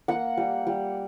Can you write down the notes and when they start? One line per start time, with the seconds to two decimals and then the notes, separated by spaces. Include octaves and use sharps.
0.08 A#3 F#5
0.37 G3
0.67 G3